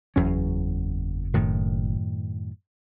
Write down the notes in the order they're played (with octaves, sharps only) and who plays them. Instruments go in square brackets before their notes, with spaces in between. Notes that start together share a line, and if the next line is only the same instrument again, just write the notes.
[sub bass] F#1 [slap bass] E2 F#3 C#4
[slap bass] F#2 A2 D#3